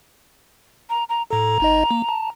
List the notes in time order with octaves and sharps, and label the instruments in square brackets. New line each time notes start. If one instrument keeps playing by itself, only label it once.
[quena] A#5
A#5
[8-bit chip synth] A2 A4 [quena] A#5
[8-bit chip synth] G#1 D#4 D#5
A#3
A5